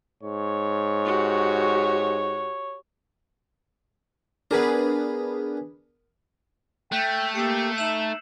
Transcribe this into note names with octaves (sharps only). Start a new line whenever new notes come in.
G#2 C#5
F#4 G4
B3 D4 G#4 A#4 B4
A3 G5 F#6 G6 B6
A#3 G4 E6 C7 C#7
D#4 E5 E7 F#7